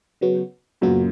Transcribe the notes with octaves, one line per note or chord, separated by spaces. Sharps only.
C#3 F#3 B3 F#4
F#2 A#2 C#3 F#3 B3 F#4